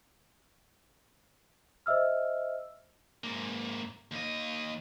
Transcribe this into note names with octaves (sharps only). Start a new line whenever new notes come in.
C5 D#5 E5 E6 F6
G#2 A#3
D#2 D#5